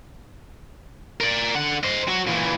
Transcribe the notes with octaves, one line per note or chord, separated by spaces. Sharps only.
A#4 D5
D3 F#5
C5 D#5
F#3 F#4
A#2 E3